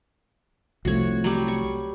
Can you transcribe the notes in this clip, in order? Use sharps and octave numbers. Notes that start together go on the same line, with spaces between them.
C2 F3 A3 F#4 C#5
F#3 G3 G4
C#6